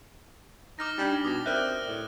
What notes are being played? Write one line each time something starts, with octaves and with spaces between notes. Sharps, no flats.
D#4 D6 F6 A#6
G3 D4 D#4
B2 D6 D#6 A#6
C4 A#4 D5 E5 F6 F#6
A2